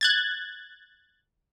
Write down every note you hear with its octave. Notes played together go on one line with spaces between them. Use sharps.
F#6 G#6 A6